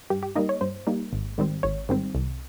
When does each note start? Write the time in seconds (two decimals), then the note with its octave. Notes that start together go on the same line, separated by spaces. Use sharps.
0.10 G2 G4
0.23 G4
0.35 G3 A#3 D#4 D#5
0.49 C#5
0.61 G2 C5
0.87 G3 A#3 D#4
1.13 G#1
1.38 G#2 D#3 G3 C4
1.63 G#1 C#5
1.89 G#2 D#3 G3 C4
2.15 C2